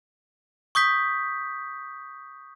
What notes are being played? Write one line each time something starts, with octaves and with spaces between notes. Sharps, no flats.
C#6 D#6 G6 B6